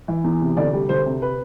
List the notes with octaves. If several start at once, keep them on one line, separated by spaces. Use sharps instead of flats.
E3
E2
C3
D2 D5
G3
D2 C5
C3
B4